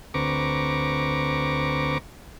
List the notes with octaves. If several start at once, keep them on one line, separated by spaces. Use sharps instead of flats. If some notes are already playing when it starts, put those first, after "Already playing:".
D2 C4 B4 A#5 C#6 D6